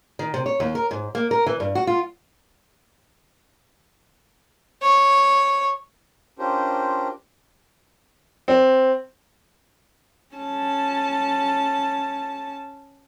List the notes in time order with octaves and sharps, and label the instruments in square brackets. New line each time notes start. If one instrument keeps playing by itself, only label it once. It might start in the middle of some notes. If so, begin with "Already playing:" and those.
[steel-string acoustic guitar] D#3
C3
C#5
D#2
A#4
G#2
A#3
A#4
E3
G2
F#4
F4
[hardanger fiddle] C#5
[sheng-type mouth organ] C#4 D4 F4 G4 A#4 C5
[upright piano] C4
[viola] C#4 A5